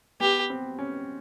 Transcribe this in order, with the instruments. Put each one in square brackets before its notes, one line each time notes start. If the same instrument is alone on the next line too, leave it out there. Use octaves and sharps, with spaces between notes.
[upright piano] B3 [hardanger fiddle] G4
[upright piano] C4
C#4